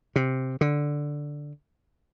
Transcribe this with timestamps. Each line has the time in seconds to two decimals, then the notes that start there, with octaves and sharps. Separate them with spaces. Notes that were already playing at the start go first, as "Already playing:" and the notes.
0.16 C3
0.61 D3